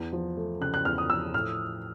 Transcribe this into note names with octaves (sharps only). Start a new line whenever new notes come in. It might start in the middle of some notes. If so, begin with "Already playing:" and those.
Already playing: E2
F3
A3
C#3 F#6
F#6
E2 F6
D#6
F3 E6
A2 F6